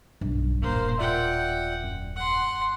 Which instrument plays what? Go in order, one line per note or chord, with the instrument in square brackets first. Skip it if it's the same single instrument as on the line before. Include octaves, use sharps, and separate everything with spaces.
[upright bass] B1 [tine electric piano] G2
[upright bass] D#1 A2 [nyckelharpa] A#3 C5
[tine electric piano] F4 D5 E5 [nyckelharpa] F#5 G5
[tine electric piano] F#2
[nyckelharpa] F#5 C6